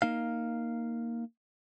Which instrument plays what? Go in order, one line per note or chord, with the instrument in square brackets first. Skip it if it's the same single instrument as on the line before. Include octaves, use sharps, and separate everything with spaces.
[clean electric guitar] A#3 D#4 F5